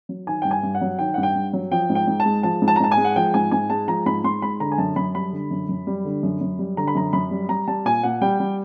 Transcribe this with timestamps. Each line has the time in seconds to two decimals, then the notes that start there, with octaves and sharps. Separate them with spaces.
0.09 F#3
0.27 D#3 G#5
0.42 G2 G5
0.51 G#5
0.63 G2
0.75 F#5
0.81 F#3
0.99 D#3 G5
1.14 G2 F#5
1.23 G5
1.35 G2
1.53 F#3
1.71 F3 G5
1.90 G#2
1.95 G5
2.07 G#2
2.20 A5
2.25 G#3
2.43 F3 A5
2.62 G#2
2.68 A5
2.76 A#5
2.80 G#2 A5
2.92 G#5
2.97 G#3
3.05 F#5
3.16 F3 G5
3.34 G#2 G#5
3.51 G#2 G#5
3.70 G#3 A5
3.88 F3 A#5
4.06 G#2 B5
4.24 G#2 C6
4.42 G#3 B5
4.60 D3 A#5
4.72 G#5
4.78 F#2 A5
4.96 F#2 B5
5.15 G3 B5
5.32 D3
5.51 F#2
5.69 F#2
5.87 G3
6.05 D3
6.23 F#2
6.41 F#2
6.59 G3
6.77 D3 A#5
6.88 B5
6.95 F#2 A#5
7.13 F#2 B5
7.31 G3
7.49 G3 A#5
7.68 G3 A5
7.85 A#2 G#5
8.03 A#2 F#5
8.21 G3 G5
8.40 G3